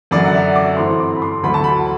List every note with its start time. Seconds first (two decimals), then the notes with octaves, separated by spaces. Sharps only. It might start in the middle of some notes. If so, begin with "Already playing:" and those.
0.11 F#2 D3 F#3 D5
0.25 F#5
0.34 E5
0.56 D6
0.77 G2 E3 A3 C4 C6
1.00 D6
1.16 B5
1.22 C6
1.43 D2 D3 F#3 A3 B5
1.54 A5
1.64 B5